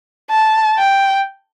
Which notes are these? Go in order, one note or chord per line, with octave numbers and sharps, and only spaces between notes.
A5
G5